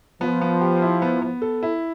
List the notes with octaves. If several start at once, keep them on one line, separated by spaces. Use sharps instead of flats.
F3 B3
B3
G4
E4
B3
B3
A4
E4